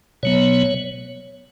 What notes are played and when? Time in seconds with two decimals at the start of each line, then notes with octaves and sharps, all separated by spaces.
0.23 B2 F#3 B3 C#5